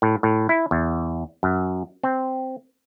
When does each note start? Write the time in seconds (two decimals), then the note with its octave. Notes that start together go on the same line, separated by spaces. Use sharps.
0.02 A2
0.23 A2
0.49 E4
0.71 E2
1.43 F#2
2.03 C4